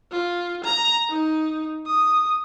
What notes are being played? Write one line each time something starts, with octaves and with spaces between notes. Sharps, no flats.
F4
A#5
D#4
D#6